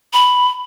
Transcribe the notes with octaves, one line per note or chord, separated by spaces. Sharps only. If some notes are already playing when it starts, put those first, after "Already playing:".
B5